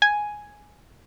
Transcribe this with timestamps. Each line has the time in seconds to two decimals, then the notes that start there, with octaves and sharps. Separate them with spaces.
0.02 G#5